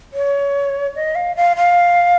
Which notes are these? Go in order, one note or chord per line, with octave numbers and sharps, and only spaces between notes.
C#5
D#5
F5
F5
F5